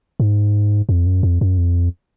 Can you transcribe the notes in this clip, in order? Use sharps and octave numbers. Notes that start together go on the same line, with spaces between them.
G#2
F2
F#2
F2
F#2
F2